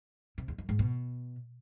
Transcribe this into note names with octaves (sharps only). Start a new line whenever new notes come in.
C3
E2
F#2
G#2
B2